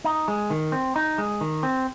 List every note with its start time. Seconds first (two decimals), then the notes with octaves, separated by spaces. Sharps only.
0.04 D#4
0.28 G#3
0.50 D#3
0.72 C4
0.96 D#4
1.18 G#3
1.41 D#3
1.63 C4